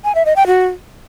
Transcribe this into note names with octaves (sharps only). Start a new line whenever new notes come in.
G#5
E5
D#5
G5
F#4